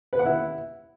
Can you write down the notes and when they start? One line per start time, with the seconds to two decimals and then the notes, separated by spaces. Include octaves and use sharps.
0.13 B4
0.19 F#5
0.25 E4